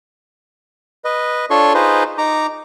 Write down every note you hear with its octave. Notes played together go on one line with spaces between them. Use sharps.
B4 D#5
D4 F4 A4 C#5 C6 C#6
D#4 F4 G#4 B4 C5 D#5
D#4 A#5 D6